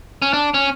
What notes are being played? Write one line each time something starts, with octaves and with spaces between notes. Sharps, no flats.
C#4
D4
C#4